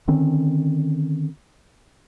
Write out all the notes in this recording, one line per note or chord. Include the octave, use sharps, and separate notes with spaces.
D3 D#3 C4 C#4